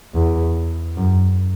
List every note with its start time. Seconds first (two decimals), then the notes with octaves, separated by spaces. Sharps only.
0.15 E2
0.97 F#2